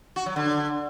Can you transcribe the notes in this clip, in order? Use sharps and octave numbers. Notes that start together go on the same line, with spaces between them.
F#4
F#3
D3